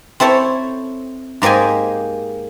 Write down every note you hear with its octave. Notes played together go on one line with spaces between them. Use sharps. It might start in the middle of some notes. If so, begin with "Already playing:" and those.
C4 E4 A4 C#5
G#2 A#3 G4 D#5 G#5